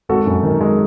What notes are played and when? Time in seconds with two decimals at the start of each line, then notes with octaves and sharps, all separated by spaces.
0.09 G#1 F#4 A4
0.26 F#2
0.43 D#3
0.61 G#3